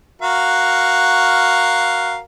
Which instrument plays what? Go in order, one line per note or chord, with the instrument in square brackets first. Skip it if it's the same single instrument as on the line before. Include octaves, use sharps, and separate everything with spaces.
[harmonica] F#4 A#4 F5